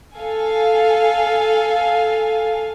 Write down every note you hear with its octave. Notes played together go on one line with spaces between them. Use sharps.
A4 F5 G#5